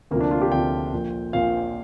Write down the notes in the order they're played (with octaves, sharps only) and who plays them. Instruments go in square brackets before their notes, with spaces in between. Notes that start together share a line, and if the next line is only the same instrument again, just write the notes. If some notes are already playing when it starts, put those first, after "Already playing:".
[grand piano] D2 C3 F3 A#3
D4
F4
G4
D2 C3 F3 G5
A#1 A#2 F3
A#1 A#2 F3 F5